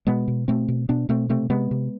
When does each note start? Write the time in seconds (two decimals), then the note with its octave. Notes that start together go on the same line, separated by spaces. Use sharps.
0.07 B2 G#3 B3
0.28 B2
0.48 B2 A3 C4
0.68 B2
0.89 B2 B3 D4
1.09 B2 A3 C4
1.29 C3 A3 C4
1.50 C3 G#3 B3
1.71 C3